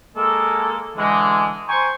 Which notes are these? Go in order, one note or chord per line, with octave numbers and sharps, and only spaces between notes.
G#3 A#3 A4
D3 E3 G#3
C5 G5 G#5 A#5 C6 C#6